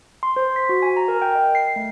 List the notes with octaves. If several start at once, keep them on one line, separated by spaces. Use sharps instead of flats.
C6
C5
B6
F#4
G#5
A#5
A#4
G5
D#5
C7
A3